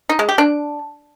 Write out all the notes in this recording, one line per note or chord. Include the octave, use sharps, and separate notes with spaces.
D#4
G#3
G4
D4